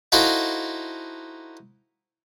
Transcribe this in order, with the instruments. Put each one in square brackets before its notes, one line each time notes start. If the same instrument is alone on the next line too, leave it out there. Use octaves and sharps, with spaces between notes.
[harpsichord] D#4 E4 F#4 A4 C5 F5